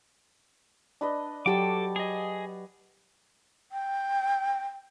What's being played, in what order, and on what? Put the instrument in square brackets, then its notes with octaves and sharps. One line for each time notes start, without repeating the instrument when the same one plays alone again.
[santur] D4 B4 D#5
[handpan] F#3 G4 [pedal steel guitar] A4 D6 [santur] F#5 A5 C#6
[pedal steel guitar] G#4 D#5
[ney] G5